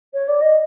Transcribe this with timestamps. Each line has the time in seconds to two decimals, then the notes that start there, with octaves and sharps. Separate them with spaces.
0.13 C#5
0.27 D5
0.40 D#5